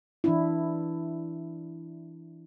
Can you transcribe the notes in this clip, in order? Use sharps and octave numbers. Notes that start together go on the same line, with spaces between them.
E3 D4 E4